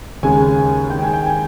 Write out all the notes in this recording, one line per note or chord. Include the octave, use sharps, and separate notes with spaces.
D#2 C#3 G#3 G#5
G2 D#3 G#3 G5
G#5
G5
G#5